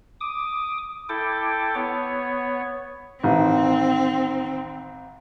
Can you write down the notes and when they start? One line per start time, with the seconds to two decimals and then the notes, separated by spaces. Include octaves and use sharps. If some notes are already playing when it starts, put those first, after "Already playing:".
0.21 D6 D#6
1.09 E4 A4 G5 D6
1.75 B3 C#5
3.23 A1 D#3 C4